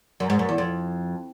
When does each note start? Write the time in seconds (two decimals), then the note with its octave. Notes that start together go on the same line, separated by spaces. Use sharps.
0.20 F#2
0.30 G#2
0.39 F#2
0.49 E2
0.58 F2